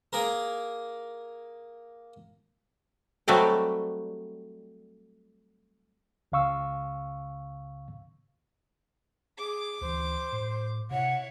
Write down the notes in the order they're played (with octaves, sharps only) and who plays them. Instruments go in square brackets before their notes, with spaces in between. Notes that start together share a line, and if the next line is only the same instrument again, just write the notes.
[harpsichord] A#3 G#4 A#4
[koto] F#3 G3 A3 C4 D5 D#5
[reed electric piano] C#2 C#3 F5 C#6 E6
[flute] G#4 [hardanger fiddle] D6
[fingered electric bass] D2 E3 [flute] C5
[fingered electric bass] A2
[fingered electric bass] C3 [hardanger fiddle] E4 C#5 [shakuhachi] F#5